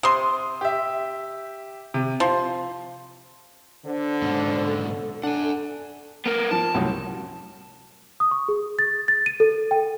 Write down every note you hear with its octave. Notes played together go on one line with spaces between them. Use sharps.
C3 C6 D#6
G4 E5
C3
F3 C6
D3 C5
G#2 B2 C#4
A4
D4 F#5 G#5
B3 A#4
F3 A5
C2 F#2 A2
D#6
C#6
G#4
A6
A6
D#7
A4
G5